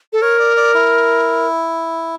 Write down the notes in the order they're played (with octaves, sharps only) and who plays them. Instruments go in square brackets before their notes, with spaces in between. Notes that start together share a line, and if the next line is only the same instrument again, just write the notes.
[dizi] A4
[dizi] A#4 [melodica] C#5
[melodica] D5
D5
E4